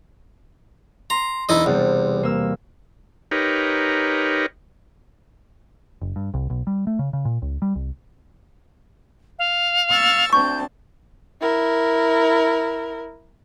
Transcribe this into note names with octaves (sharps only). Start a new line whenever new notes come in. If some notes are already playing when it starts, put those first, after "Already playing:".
A#5 C6
E1 D#4 E4 D#5 A6
E2 C3 G3
A#3 E6
D#4 G4 A#4 B4 C#5
F#1
G2
C2
B1
G3
A3
C#3
C#3
A#2
C#2
G3
C2
F5
C#6 E6 A6
D2 C4 A5 C#6 G6
E4 A#4